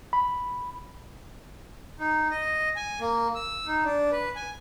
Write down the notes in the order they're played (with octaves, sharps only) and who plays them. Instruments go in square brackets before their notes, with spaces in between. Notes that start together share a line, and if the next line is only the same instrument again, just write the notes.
[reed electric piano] B5
[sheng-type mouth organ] D#4
D#5
G#5
A#3
E6
D#4
D4
B4
G#5